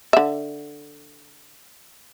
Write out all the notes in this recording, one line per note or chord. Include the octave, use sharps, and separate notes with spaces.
D3 E5